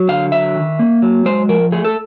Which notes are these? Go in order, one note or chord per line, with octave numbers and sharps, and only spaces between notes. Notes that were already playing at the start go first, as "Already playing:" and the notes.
Already playing: F#3
D3 F5
F#3 E5
D#3
A#3
F#3
G#3 C5
F3 A#4
A3 G#4
A4